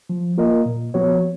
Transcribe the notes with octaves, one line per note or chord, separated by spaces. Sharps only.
F3
A#3 F4 A#4 D#5
A#2
F3 B3 F#4 C#5